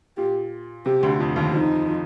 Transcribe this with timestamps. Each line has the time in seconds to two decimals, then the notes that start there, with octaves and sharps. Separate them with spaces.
0.17 A#2 G4
0.86 C3 G4
1.03 D2 D3
1.19 F2 F3
1.36 D#2 D#3
1.53 F2 F3 D#4
1.87 F3